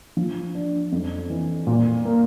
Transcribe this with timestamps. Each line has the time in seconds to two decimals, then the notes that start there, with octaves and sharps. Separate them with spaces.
0.17 F3
0.55 D4
0.92 F2
1.30 E3
1.67 A#2
2.05 A#3